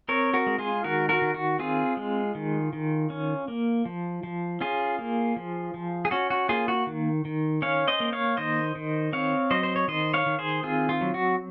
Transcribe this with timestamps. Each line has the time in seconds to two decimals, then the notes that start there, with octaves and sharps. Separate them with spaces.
0.09 C4 A#4 C#5
0.34 F#4 A#4
0.47 G#3
0.59 F4 G#4
0.84 D#3 F#4 A#4
1.09 F#4 A#4
1.22 D#3
1.34 F#4
1.59 C4 F4 G#4
1.97 G#3
2.35 D#3
2.73 D#3
3.10 C#4
3.48 A#3
3.85 F3
4.23 F3
4.61 C#4 F4 G#4
4.99 A#3
5.36 F3
5.74 F3
6.05 G#4
6.11 C#4 F#4
6.30 F#4
6.49 A#3 F4 G#4
6.68 F#4
6.87 D#3
7.25 D#3
7.62 C#4 C#5 F5
7.88 C5 D#5
8.00 A#3
8.13 C#5 F5
8.37 D#3 C5 D#5
8.75 D#3
9.13 C4 C#5 F5
9.51 F#3 C5 D#5
9.63 C5
9.76 C#5
9.88 D#3 C5 D#5
10.14 C#5 F5
10.26 D#3
10.39 G#4 C5
10.63 C4 F4 G#4
10.89 F4
11.01 F#3
11.14 F#4